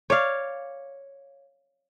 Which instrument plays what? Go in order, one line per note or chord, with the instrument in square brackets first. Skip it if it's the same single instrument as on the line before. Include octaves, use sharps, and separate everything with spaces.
[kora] C#5 D5 F5